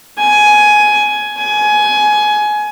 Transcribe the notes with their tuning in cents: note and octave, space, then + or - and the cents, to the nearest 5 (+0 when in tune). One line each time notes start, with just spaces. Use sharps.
G#5 +15
G#5 +20